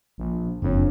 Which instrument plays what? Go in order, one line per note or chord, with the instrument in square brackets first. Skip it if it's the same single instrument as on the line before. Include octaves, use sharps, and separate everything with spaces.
[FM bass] A#1
[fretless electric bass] F#1 [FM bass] F2 [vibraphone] D4 C#5